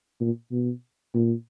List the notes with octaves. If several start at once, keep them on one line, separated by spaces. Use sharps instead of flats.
A#2
B2
A#2